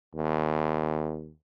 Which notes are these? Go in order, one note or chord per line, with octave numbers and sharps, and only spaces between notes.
D#2